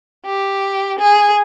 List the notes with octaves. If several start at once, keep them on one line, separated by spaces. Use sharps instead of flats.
G4
G#4